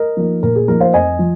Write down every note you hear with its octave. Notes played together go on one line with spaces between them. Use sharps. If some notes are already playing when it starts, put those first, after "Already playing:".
Already playing: A#4 D#5
F3 A#3 D#4
A#2 A#4
G#4
F3 A#3 D#4 A#4
C5 F5
F2 D#5 G#5
F3